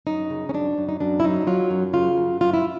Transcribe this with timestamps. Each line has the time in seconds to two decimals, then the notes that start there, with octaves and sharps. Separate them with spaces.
0.07 F#2 D#4
0.30 C#3
0.49 C#4
0.54 F#2 D4
0.78 F#2
0.89 D#4
1.00 F#2 D4
1.20 E4
1.24 F#3 D#4
1.47 F#3 F4
1.71 F#2
1.94 C#3 F4
2.18 F#2
2.41 F#2 F4
2.54 E4